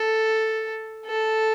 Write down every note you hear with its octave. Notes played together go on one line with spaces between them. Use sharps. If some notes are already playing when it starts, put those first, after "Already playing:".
Already playing: A4
A4